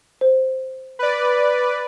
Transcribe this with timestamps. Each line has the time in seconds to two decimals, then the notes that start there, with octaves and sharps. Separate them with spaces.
0.21 C5
0.99 B4 D5